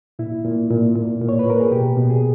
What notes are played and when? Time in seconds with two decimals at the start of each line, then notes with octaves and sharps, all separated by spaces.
0.19 A#2 E4
0.44 A#2
0.70 A#2
0.95 A#2
1.21 A#2
1.29 C#5
1.39 B4
1.46 A#2 A#4
1.60 G#4
1.71 B2 G4
1.97 B2
2.10 G#4